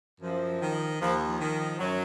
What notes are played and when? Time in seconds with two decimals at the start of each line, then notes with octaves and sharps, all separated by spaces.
0.21 F#2 F3
0.60 D#3
1.00 D#2 F3
1.27 F3
1.40 D#3
1.79 F#2 F#3